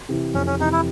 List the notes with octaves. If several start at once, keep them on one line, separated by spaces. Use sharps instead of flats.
C3 E3
F2 C#4
C#4
C3 E3 D#4
E4